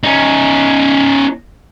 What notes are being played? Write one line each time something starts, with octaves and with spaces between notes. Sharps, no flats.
C#4 D#4